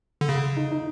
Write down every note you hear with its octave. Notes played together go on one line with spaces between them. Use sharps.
D3
C#3
D#4
D#4